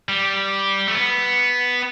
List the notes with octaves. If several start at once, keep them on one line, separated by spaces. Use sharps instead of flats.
G3
A3
B3